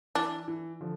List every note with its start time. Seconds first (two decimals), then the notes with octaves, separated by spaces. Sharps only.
0.15 E3 D4
0.48 E3
0.81 D3 F3